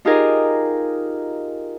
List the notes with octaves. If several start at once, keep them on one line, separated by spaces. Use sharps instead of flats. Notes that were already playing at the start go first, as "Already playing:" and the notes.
D#4 F4 G4 G#4 A#4 D#5